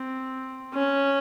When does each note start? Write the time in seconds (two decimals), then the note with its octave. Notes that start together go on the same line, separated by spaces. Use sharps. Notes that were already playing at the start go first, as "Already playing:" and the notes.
Already playing: C4
0.74 C#4